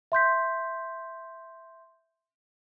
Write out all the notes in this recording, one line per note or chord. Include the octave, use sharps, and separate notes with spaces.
E5 C6 G6 B6